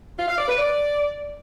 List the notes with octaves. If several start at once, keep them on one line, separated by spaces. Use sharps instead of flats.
F4
F5
D5
B4
D5